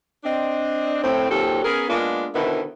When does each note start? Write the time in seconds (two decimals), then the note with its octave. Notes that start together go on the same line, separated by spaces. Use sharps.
0.24 C4 D4 D#5
1.03 A2 C4
1.29 A#2 D#3 F#3 C4 G4 A4
1.64 B3 C#4 G#4 A#4
1.89 G#3 A#3 B3 D4 F4
2.34 B2 D3 D#3 B3 C4 E4